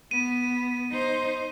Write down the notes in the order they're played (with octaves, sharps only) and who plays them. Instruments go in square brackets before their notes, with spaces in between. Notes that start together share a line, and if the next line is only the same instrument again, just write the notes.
[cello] B3 [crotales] D#7
[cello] D#4 C5